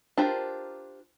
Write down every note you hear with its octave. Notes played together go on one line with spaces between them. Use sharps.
D4 F4 G4 A#4 C5